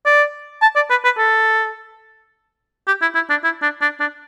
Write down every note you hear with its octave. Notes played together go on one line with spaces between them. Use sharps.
D5
A5
D5
B4
B4
A4
G4
E4
E4
D4
E4
D4
D4
D4